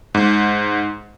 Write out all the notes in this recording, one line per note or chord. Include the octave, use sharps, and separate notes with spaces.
G#2